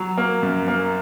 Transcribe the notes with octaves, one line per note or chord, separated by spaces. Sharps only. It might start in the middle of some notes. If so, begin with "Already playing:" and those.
Already playing: F#3
A#3
F#2
A#3